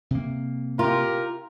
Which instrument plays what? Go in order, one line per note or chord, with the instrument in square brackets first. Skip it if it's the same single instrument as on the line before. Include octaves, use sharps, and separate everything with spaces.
[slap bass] C3 A#3
[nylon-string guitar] F4 [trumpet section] G4 A#4